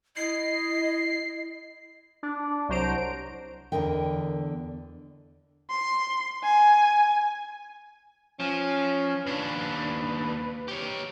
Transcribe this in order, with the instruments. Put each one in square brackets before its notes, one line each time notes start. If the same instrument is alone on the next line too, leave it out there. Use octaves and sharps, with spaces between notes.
[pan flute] E4 [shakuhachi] D#5 [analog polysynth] C7
[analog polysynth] D4
C2 F#3 C5 A#5 D7
[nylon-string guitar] E2 G#2 D3 A#4 D#5 G5
[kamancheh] C6
G#5
[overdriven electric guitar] F3 [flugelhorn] C#4
[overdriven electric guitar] D#2 D4 [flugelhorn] B4
[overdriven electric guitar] G4 C#5